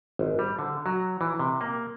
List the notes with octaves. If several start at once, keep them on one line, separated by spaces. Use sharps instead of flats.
G#1
G3
D3
F#3
E3
C3
A#3